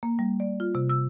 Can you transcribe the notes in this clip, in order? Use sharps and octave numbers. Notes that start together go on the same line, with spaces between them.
A#3
G3
D5
F4
C3
E6